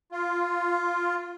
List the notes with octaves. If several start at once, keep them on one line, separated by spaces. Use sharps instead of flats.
F4